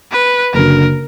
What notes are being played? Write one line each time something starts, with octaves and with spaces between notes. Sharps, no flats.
B4
F#1 F#2 D3 A#4